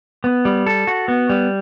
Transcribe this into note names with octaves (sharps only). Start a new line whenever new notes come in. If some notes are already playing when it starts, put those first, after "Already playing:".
B3
G3
A4
F#4
B3
G3